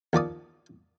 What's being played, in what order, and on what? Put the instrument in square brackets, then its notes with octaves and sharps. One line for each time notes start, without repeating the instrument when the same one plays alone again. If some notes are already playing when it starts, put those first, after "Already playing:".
[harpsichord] D#2 F3 D5 D#6